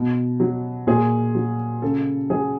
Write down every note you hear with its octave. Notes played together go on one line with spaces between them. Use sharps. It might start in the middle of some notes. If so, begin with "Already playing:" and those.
Already playing: B2
F#3
A#2 G#4
F#3
C#3 A4
F#3 G#4